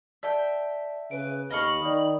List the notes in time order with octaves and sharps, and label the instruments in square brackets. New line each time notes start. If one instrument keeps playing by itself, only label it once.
[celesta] D5 A5 [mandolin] E5 G5
[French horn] C#3 [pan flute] B4 [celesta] D7
[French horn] D#2 [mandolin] D#5 F5 C#6 [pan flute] B5
[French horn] D#3 [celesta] D5 D#6